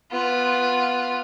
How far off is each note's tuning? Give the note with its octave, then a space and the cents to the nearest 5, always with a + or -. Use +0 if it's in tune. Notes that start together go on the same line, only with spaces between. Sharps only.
B3 +0 F4 +0